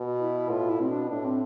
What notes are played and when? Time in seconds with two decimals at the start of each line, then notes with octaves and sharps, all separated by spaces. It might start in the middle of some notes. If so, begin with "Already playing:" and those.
Already playing: B2
0.19 E4
0.49 A2 F4
0.70 E4
0.80 B2 C4
0.90 D4
1.09 A2 D4
1.25 C4